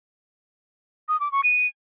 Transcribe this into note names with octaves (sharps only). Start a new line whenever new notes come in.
D#6
D6
C#6
D#7